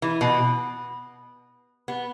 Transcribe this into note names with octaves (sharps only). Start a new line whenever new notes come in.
E3
B2
B3